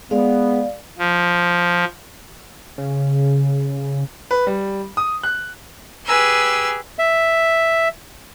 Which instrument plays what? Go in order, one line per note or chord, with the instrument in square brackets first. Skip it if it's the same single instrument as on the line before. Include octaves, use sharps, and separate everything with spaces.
[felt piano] G#3 [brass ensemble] B3 [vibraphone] D5 F5
[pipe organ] F3
[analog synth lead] C#3
[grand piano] B4
G3
D#6
F#6
[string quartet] G4 G#4 B4 G#5 E6
[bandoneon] E5